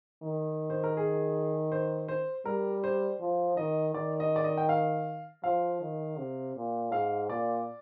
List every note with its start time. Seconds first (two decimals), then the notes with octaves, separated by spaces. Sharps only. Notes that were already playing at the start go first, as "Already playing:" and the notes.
0.23 D#3
0.70 C5
0.84 A#4
0.97 G#4
1.72 C5
2.08 C5
2.45 G3 A#4
2.84 C5
3.20 F3
3.57 D#3 D#5
3.94 D#3 D5
4.20 D#5
4.36 D5
4.44 D#5
4.58 G5
4.69 F5
5.44 F3 F5
5.81 D#3
6.18 C3
6.56 A#2
6.92 G#2 F5
7.29 A#2 D5